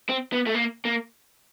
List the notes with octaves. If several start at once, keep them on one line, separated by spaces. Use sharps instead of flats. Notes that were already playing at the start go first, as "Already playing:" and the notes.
C4
B3
A3
A#3
A#3